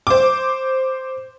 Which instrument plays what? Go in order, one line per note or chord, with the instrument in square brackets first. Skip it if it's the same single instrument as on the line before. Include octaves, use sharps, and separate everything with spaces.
[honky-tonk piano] C5 D6